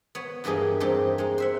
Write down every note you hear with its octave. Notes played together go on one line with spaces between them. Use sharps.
B3 C#5
E2 G2 A#3 G4 G#4 D#5
E2 G2 C4 D#4 G4 C5
G#3 D#4
C5 E5 F#5